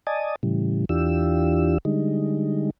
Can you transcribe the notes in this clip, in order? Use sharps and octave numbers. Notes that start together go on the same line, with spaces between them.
D5 D#5 G#5 A5 D#6
A2 C#3 E3 G3
E2 E3 D4 F4 G4 E6
D3 G3 G#3 D#4